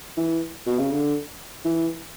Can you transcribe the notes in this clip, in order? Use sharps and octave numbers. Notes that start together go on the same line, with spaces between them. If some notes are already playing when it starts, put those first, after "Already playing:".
E3
B2
C#3
D3
E3